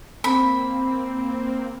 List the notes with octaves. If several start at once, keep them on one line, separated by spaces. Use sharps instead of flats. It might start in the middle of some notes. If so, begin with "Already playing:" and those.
A#3 C4 B5